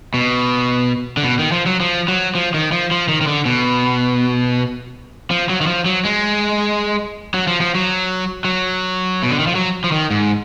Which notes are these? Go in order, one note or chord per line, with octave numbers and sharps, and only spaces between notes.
B2
D3
B2
D#3
F3
F#3
F3
F#3
F3
D#3
F3
F3
D#3
D#3
D3
B2
F3
F#3
D#3
F3
F#3
G#3
F#3
F3
F3
F#3
F#3
B2
D3
D#3
F3
F#3
F3
D#3
G#2